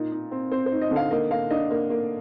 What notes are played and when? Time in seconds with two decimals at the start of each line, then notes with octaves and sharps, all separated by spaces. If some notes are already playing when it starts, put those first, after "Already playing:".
Already playing: A#2 D#4
0.12 D#4
0.32 C4
0.52 C4 C5
0.66 C5
0.72 D#4
0.81 D#5
0.91 D3
0.96 F5
1.11 A#3 D#5
1.31 A#3 F5
1.50 D4 D#5
1.70 A#3
1.90 A#3